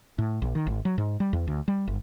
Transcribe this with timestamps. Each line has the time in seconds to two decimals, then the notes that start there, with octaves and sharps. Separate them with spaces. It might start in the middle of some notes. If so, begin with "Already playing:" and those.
0.18 A2
0.42 A#1
0.55 D#3
0.67 G#1
0.85 F#3
0.98 G#2
1.20 G3
1.33 E2
1.47 D2
1.68 G3
1.88 G1